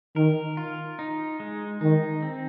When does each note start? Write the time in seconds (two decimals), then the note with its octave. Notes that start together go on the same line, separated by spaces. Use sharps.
0.16 D#3 A#4
0.57 F4
0.99 D#4
1.40 G#3
1.81 D#3 D#4
2.22 C4